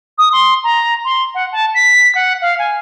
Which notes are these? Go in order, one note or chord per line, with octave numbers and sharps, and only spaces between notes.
D#6
C6
A#5
C6
F#5
A5
B6
F#5
F5
G#5